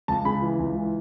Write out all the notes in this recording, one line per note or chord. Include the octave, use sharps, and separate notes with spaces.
C#2 A5
C#3 B5
E3
C#2
E3